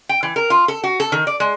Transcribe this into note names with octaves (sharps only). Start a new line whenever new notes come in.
G5
E3
A#4
F4
A4
F#4
A4
D#3
D5
G#3